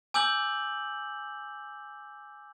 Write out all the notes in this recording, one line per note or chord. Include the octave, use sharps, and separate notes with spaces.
G#5 D6 E6 G6 F#7